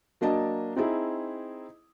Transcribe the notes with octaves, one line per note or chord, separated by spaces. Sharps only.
F#3 A#3 D4 D#5 A5
C4 D#4 E4 G#4